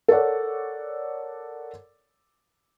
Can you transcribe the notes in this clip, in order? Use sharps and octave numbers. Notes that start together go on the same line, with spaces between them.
A4 A#4 C#5 D5 F#5